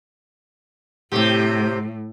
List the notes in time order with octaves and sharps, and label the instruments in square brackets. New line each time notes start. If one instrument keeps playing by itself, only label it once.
[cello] A2 [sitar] C3 G4